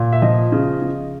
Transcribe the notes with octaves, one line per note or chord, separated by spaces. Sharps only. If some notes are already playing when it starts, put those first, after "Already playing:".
Already playing: A#2
E5
F3 D#5
C#3
C#3